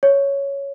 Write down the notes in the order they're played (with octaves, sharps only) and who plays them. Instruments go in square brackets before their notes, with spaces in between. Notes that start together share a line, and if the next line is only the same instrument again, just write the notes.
[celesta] C#5